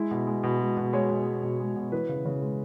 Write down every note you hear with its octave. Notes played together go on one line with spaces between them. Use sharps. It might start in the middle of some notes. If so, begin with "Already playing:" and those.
Already playing: G#3 E4
B2
G#3
B2
G#3
B2
G#3 C#5
B2
G#3
B2
G#3
B2
E3 B4
C#3
C#3
G#3